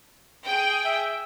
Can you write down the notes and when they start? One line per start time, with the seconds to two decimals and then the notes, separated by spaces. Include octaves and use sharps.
0.46 G#4 G5
0.85 E5